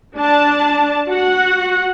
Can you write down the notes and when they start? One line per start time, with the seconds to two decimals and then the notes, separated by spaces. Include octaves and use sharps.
0.16 D4 A5
1.09 F#4 F#5